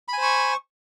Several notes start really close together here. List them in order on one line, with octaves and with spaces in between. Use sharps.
B5 G#5 C5 C#6